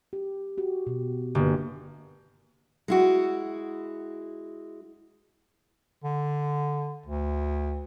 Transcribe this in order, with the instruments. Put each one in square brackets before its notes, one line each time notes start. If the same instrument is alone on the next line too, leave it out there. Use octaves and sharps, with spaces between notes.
[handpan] G4
F#4 G4
B2
[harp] G1 [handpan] A#3 G4
[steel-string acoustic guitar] G#3 E4 F#4
[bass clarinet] D3
D2